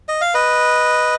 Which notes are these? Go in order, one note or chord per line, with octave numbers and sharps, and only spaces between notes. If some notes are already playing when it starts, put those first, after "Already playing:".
D#5
F5
B4 D#5